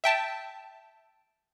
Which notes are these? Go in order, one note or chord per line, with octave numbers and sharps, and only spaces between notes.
E5 G5 A5